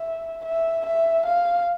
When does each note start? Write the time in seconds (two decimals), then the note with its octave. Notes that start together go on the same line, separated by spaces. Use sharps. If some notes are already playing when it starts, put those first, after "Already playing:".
Already playing: E5
0.45 E5
0.86 E5
1.26 F5